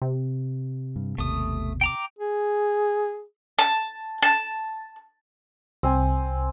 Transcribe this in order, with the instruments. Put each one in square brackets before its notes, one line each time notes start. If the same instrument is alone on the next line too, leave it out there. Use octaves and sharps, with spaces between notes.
[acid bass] C3
[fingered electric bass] G2
[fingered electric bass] G#1 D#2 B2 [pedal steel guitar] A3 D#6
[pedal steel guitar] G5 A#5 D6
[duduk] G#4
[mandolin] A5
A5
[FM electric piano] C2 [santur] C4 G#5